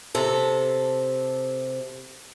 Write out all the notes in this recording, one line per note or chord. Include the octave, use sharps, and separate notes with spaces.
C3 A4